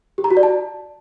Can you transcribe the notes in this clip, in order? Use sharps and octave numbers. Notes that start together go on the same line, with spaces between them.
G4
A#5
F#4
D5
A5